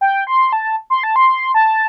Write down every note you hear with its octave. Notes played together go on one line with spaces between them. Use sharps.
G5
C6
A5
C6
A5
C6
A5